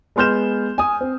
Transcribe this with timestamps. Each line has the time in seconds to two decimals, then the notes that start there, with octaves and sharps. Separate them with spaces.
0.16 G#3 B3 C6 F6 G6 E7
0.78 G#5 D#6
1.01 C4